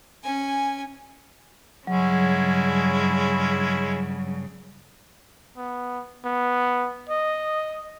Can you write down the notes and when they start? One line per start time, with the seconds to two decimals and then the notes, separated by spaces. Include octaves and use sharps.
0.24 C#4 G#5
1.87 G2 C#3 F#3 G#3 C#4 E4
5.57 B3
6.25 B3
7.09 D#5